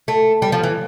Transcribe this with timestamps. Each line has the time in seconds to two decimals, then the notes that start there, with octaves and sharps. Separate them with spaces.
0.08 A3
0.42 G3
0.52 F3
0.63 E3